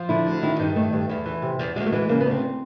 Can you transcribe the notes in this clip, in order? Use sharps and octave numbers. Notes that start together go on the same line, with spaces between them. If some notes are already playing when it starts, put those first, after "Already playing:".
Already playing: F3
D3 E4
D2
D#3 E4
G2 D#4
D#3 A3
G2
E2
E3
C3
E2
D2 G#3
A3
E3 G#3
C#3 A#3
B3
D2
C4